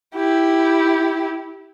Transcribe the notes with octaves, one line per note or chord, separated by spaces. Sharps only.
E4 G4